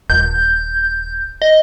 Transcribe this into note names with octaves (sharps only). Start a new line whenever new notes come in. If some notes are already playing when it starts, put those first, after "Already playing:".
D#1 G6
D#5